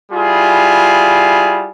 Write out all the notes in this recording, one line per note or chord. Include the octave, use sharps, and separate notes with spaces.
G3 E4 F4 G#4